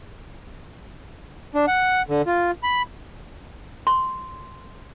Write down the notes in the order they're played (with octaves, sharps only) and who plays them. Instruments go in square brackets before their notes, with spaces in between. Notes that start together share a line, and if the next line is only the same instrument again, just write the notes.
[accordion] D4
F#5
D3
F4
B5
[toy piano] C6